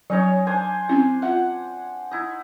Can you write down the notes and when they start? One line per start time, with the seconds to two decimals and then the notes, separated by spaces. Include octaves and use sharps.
0.10 F#3 C#4 D#4 C#5
0.47 D4 C5 G#5
0.89 C4 C#4 E4
1.22 F4 E5 F#5
2.11 D#4 E4